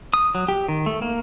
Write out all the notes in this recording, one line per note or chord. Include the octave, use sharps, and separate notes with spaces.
D#6
F#3
G4
D#3
A3
A#3